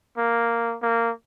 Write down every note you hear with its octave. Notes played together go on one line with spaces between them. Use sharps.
A#3
A#3